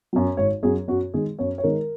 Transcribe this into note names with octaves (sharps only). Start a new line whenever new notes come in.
F#2 F#3
G#1 C#5
F#2 F#3 G#4
F#2 F#4
D#3 G#3 G#4
F#2 C#5
C#5
D#3 G#3 A#4